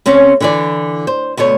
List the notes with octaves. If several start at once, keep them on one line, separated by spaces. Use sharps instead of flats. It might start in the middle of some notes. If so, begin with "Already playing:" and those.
C#3 C4 C#4 C#5
D3 E3 D5
C5
D2 B2 A3 C#5